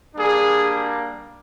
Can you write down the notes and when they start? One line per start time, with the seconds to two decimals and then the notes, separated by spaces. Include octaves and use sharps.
0.14 G3 A#3 D4 G#4